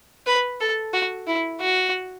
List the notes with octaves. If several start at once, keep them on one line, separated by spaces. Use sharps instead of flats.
B4
A4
F#4
E4
F#4